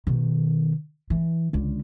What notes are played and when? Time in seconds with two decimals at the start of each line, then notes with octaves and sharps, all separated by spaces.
0.07 B2 D#3
1.10 E3
1.53 C#2 D3